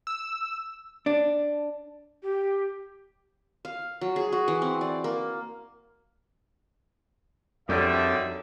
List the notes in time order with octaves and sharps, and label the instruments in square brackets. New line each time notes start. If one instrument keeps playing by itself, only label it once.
[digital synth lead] E6
[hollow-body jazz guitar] D4
[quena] G4
[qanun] F5
F#3
G#4
F#4
E3
C4
D5
A#3
[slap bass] F2 [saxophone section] D3 D#3 G3 [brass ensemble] F#4 C#5 E5